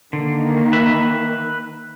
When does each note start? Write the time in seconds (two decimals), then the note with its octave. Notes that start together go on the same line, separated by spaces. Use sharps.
0.13 D3 D#3 A#3
0.73 B4 E5